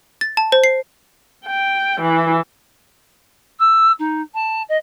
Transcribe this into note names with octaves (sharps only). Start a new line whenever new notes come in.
A6
A5
C5
C7
G5
E3
E6
D#4
A5
D#5